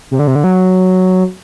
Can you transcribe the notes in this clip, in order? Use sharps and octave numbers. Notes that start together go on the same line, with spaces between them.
C3
D3
C3
D3
F#3